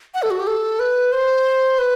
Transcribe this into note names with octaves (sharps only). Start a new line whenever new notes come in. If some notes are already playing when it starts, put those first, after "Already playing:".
F#5
A4
F#4
G4
A4
B4
C5
B4